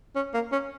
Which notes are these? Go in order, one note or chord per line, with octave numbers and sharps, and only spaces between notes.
C#4
A#3
C#4